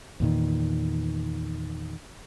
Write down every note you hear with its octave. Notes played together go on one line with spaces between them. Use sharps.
E2 A#2 D#3